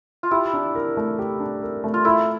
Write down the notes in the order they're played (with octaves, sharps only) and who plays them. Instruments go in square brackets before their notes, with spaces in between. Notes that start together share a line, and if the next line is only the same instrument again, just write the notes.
[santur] F4
[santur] E4 [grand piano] G4
[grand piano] D4
A#4
A3
G4
D4
A#4
A3
[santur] F4
[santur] E4 [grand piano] A4